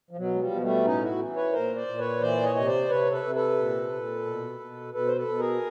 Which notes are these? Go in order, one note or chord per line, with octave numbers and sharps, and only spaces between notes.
F3
B2 F#3
G#3
F3 G3
B2
G3 A3
A2 C#4 D#4
E4 F#4
E3
B4 C#5
A#2 A#4 C5
C5 D5
A#2
B4 C#5
E3 C5 D5
C#5 D#5
C3 D#5
C5 D5
C3 B4 C#5
A4 B4
C3
A4 B4
A#2
A#2
B2
B2
B2 A4 B4
C5
A4 B4
B2
G#4 A#4